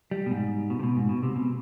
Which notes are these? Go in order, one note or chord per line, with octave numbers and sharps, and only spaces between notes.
G3
B2
G#2
B2
C3
B2
G#2
B2
C3
B2